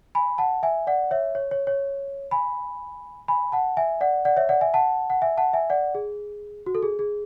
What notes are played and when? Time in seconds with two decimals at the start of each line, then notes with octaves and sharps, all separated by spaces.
0.15 G#5 B5
0.38 F#5 A5
0.63 E5 G#5
0.87 D5 F#5
1.11 C#5 E5
1.35 C#5
1.51 C#5
1.67 C#5
2.31 G#5 B5
3.28 G#5 B5
3.52 F#5 A5
3.77 E5 G#5
4.01 D5 F#5
4.25 D5 F#5
4.37 C#5 E5
4.49 D5 F#5
4.61 E5 G#5
4.74 F#5 A5
5.10 F#5
5.22 E5 G#5
5.37 F#5 A5
5.53 E5 G#5
5.70 D5 F#5
5.95 G#4
6.66 F#4
6.75 A4
6.83 G#4
6.99 G#4